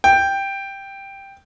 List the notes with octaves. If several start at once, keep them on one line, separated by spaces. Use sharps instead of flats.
G5